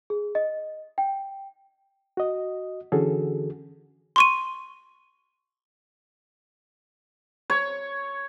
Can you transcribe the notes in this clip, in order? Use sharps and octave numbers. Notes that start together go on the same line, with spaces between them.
G#4
D#5
G5
F#4 D#5
D3 E3 C#4 F#4 G#4 A4
C6 C#6 D#7
C#5